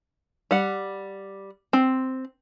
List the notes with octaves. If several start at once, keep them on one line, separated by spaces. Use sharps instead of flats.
G3 F#5
C4